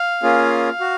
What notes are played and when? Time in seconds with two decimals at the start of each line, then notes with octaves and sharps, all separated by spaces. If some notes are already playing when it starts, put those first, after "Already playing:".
Already playing: F5
0.23 A#3 C#4 F4 G#4
0.80 F#4